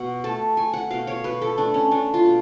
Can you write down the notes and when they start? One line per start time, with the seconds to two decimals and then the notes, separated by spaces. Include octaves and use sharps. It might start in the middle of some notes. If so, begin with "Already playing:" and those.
Already playing: B2 F#5
0.24 A3 A5
0.57 A3 G#5
0.74 F#5
0.90 B2 F5
1.07 C#5
1.24 B2 B4
1.42 A4
1.58 A3 D4
1.74 C#4
1.91 A3 D4
2.14 F4
2.25 B2